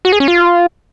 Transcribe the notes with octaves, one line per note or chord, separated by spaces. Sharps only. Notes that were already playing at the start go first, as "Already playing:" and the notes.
F#4
G#4
C#4
F4